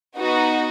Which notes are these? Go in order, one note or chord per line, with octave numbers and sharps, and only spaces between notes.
B3 D#4 F#4